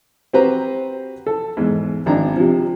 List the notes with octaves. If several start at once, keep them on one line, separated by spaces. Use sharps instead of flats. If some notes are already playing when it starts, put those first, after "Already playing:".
C4 F#4 G4 B4 C5 A#5
A4
E2 G#2
G#1 D4 A#5
C3 F3